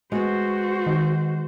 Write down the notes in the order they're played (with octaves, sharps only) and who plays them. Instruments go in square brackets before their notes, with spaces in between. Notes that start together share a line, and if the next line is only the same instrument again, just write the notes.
[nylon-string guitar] G#3 B3 [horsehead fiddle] F#4 C5
[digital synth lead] D#3